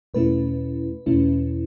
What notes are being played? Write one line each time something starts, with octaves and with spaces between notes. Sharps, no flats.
E2 B2 A3 C#4 E4 B4
E2 B2 A3 C#4 E4